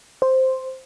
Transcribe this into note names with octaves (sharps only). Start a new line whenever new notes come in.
C5